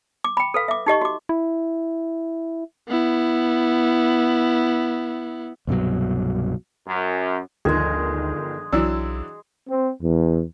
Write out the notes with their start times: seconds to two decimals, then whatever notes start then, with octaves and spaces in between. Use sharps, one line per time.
0.24 D6
0.37 G5 B5
0.54 A4 B4 F5
0.68 E5 D6
0.86 D#4 G4 D#5 C#6
1.01 F#4 D6
1.29 E4
2.88 B3 E4
5.67 C2 G2 B2 F#3
6.86 F#2
7.65 G1 D2 D#3 F3 G#3 G#4
8.73 B1 E3 F#3 D4 E6
9.68 C4
10.01 E2